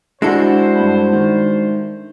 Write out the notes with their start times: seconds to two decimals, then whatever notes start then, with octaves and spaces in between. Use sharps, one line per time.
0.22 G#3 D4 E4 F#4 A4 C5
0.75 G2 F#5 B5
1.13 D#3